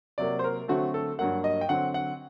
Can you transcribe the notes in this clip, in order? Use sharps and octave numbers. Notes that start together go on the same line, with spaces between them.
C3 F#3 A#3 D5
C5
A#4
D3 F#3 A3 C4 F#4
A4
G2 F#3 A#3 F#5
D#5
G5
D3 F#3 C4 F#5
F#5